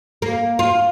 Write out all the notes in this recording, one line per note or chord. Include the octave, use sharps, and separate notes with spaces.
A#3
F4